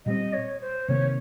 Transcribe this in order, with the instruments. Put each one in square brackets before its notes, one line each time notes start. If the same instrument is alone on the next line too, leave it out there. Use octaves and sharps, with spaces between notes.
[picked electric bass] A#2 G3 C4 [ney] D#5
[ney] C#5
C5
[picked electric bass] C3 D#3 A#3 [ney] C#5